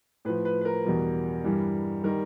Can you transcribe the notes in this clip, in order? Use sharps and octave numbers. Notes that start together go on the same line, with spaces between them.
A2 F3 B4
B4
B4
A#4
E2 B2 G3
G2 E3 G3
D#3 G3 A#4